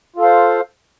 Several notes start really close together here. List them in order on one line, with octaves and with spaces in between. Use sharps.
F4 A4 F5 C5